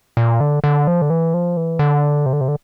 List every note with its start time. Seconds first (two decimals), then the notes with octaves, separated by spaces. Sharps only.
0.17 A#2
0.40 D3
0.64 D3
0.87 F3
1.02 D3
1.10 E3
1.34 F3
1.57 E3
1.79 D3
2.26 C3
2.33 D3
2.41 C3
2.48 D3